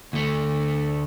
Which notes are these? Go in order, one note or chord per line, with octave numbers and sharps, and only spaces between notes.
D2 A3